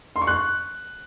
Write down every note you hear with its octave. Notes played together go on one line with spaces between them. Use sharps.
C6
C#6
F#6